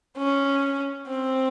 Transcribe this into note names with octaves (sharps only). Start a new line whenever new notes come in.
C#4
C4